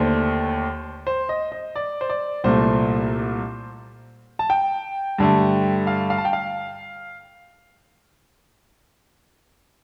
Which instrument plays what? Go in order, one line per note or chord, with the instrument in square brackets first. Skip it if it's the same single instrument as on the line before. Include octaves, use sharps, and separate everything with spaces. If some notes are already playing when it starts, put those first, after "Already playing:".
Already playing: [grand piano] D#2 D3 A3 D4 C5
C5
D#5
D#5
D5
C5
D5
C2 A#2 A3 C5
A5
G5
G2 D3 A3
F5
F5
A5
G5
F5